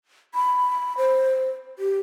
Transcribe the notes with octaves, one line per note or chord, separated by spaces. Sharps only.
B5
C5
G4